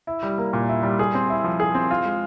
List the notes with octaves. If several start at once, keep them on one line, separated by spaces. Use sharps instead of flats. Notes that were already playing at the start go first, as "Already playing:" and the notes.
E4
G3
A#3
A#2
E4
G3
G#4
C4
E4
F3
G#4
C4
F4
G#3